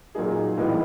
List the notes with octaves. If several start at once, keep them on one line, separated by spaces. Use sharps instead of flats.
A#2 F#3 A#3 D#4 G#4
A2 E3 G3 B3 D#4